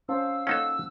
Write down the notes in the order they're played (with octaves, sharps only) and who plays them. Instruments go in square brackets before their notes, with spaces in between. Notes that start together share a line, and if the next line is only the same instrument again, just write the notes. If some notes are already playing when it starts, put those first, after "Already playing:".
[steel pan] C#4 C5 A5 [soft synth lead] F5 [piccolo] E6
[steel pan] A#3 F#5 A5 [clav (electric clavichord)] C#4 D#4 A4 [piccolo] E6